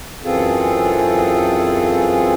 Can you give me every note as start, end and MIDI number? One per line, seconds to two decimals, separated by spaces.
0.24 2.34 42
0.24 2.34 52
0.24 2.34 60
0.24 2.34 65
0.24 2.34 68
0.24 2.34 69